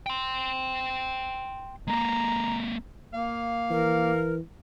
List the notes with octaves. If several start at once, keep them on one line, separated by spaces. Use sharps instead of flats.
G5 C6
G#3 A#3 A#5
A#3 F5
E3 A#4